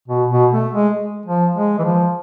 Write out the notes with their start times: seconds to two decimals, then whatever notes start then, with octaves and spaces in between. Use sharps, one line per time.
0.08 B2
0.30 B2
0.52 A3
0.74 G#3
1.26 F3
1.55 G#3
1.79 E3
1.84 F3